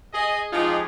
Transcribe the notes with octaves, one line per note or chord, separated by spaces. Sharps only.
G#4 D#5
F3 G#3 D#4 F4 G4 G#4